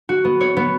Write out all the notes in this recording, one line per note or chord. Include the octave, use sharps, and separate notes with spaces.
F#4
B3
C#5
B3